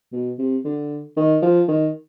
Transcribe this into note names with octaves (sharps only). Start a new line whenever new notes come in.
B2
C3
D3
D#3
F3
D#3